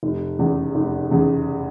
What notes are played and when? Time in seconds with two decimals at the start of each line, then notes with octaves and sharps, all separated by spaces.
0.03 F1
0.39 E2 C#3
0.75 F1
1.11 E2 C#3